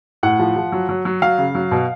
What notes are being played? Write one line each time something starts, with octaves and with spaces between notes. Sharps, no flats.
A2 F#5
F3
F3
F#3
F#3
F#3
F#3 F5
C#3
F#3
B2